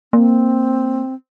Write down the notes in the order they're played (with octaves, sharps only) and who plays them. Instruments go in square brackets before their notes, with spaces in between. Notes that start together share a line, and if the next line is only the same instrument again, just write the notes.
[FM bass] A#3 [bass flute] C4